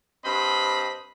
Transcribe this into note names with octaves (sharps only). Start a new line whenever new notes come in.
G2 C4 C5 D#5 B5